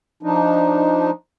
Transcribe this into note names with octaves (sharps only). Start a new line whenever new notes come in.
F3 D4 D#4